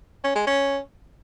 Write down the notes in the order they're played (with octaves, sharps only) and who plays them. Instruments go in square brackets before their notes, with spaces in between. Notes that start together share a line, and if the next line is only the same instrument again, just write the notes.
[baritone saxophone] C#4
G#3
C#4